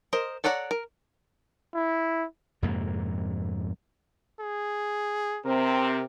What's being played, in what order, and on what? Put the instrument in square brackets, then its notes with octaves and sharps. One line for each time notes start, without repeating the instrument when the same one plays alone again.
[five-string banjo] A#4 C5 D#5
A4 C#5 D5 F#5 A#5
A#4
[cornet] E4
[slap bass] F2 G#2 C3 A#3
[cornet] G#4
[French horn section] C3 C4 [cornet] A#4